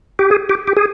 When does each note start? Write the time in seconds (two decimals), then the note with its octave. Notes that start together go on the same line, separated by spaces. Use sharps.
0.19 G4
0.31 G#4
0.49 G4
0.67 G4
0.77 G#4